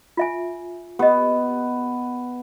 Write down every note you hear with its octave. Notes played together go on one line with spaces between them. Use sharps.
F4 E5 G#5
B3 G4 D#5